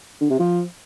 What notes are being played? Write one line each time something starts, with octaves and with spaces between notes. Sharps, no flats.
D3
C3
F3